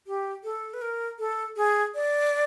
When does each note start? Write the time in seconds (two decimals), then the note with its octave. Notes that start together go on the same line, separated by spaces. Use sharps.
0.07 G4
0.44 A4
0.74 B4
0.82 A#4
1.19 A4
1.57 G#4
1.95 D5